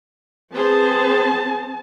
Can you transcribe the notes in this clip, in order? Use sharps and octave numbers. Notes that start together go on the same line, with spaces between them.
B3 C4 G#4 C5 A5